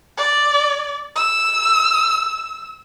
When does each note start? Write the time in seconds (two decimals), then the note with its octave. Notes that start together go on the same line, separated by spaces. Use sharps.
0.18 D5
1.16 E6